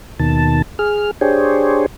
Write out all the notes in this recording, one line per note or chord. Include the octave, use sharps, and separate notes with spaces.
D#2 B2 D#3 A5
G#4 F6
D4 G4 G#4 C5 C#5